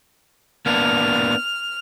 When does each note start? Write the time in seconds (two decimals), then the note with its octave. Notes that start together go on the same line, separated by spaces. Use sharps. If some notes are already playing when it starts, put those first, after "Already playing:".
0.66 A#3 B3 D4 F6